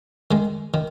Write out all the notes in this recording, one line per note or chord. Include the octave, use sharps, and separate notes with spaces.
D#3 G#3
D#3